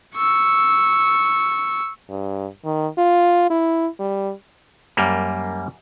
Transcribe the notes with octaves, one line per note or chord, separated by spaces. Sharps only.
C#6 E6
G2
D#3
F4
E4
G3
F#2 G3 A#3